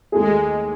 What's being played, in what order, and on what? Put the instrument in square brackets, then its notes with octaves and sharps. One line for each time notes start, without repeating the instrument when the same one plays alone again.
[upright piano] D#2 D#3 A3 D#4 G#4 [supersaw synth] G#3